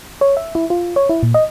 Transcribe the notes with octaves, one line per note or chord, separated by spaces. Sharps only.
C#5
E5
E4
F4
C#5
E4
A#2
D#5